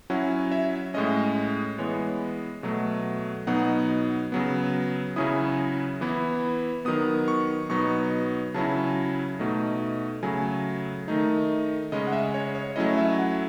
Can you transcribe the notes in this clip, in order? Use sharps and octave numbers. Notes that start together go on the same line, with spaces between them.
F#3 C#4 E4 F#5
E5
A2 G#3 C#4 D#5
E3 G#3 B3 C#5
B2 F#3 A3
B2 F#3 B3 D#4 F#5
C#3 F#3 B3
C#3 F#3 C#4 E4 D#6
E3 B3 E4
D#3 F#3 B3 D#6
C#6
B2 F#3 B3 D#4 C#6
C#3 F#3 C#4 E4 A5
B2 A3 D#4
C#3 F#3 A3 G#5
D#3 A3 D#4
C#3 G#3 C#4 D#5
F#5
E5
C#5
C#5
F#3 A3 C#4 E4 D#5
E5
F#5